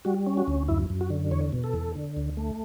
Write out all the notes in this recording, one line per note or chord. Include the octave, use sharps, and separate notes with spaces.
G3 F#4
C#4
F#4
D2
F#2 E4
F#2
F#4
D3
E2 C#5
B2
A4
E2
D3
D2
A3